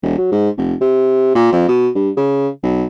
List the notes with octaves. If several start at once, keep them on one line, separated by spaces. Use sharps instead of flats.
E1
F#3
G#2
F1
C3
A#2
F2
B2
G2
C#3
B1